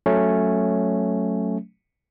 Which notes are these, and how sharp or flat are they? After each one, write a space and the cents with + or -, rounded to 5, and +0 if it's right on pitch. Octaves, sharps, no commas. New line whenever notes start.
F#3 +0 A3 +0 C#4 +0